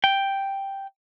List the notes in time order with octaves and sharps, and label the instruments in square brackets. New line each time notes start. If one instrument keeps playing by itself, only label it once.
[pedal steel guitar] G5